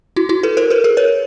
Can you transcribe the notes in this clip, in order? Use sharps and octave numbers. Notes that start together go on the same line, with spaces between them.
E4 F#4
E4 F#4
A4 B4
A#4 C5
A4 B4
G#4 A#4
B4 C#5